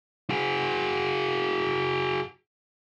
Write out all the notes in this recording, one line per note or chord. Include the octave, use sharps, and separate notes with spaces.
F#4 G#4